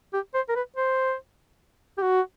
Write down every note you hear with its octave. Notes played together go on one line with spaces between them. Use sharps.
G4
C5
A#4
B4
C5
G4
F#4